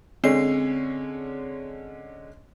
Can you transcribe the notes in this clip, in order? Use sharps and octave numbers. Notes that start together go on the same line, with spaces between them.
D3 G#3 C4 C#4 C7